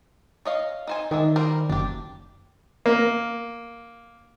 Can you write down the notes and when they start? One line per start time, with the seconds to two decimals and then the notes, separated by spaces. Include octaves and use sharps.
0.45 C#5 D#5 F5
0.87 D#4 C5 G#5
1.11 D#3 G#3 D4 E5
1.36 G3 A#4 C5
1.69 F#1 D4 G4
2.86 A#3